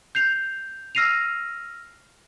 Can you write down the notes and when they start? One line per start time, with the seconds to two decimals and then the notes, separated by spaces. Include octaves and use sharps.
0.15 G6 C7 F7
0.95 E6 F6 A#6 C7 D#7 F7